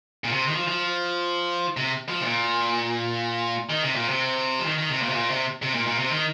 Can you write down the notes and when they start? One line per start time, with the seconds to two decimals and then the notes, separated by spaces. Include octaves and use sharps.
0.24 A#2
0.32 C3
0.48 D#3
0.56 F3
0.68 F3
1.77 C3
2.09 F3
2.21 C3
2.25 A#2
3.70 D#3
3.83 C3
3.95 A#2
4.09 C3
4.60 F3
4.66 D#3
4.78 D#3
4.90 C3
5.02 A#2
5.09 C3
5.14 A#2
5.30 C3
5.62 C3
5.74 A#2
5.87 A#2
5.99 C3
6.11 D#3